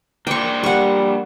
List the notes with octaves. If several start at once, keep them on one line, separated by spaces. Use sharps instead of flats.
A#3 D4 C5 G5 C#6
G3 F#5 C#6